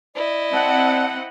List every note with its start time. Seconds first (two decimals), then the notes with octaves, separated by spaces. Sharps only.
0.16 E4 D5 D#5
0.52 C4 F#5 A5